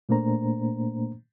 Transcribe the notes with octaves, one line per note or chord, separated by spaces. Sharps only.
A#2 A3 A#3 D4 C5 A#5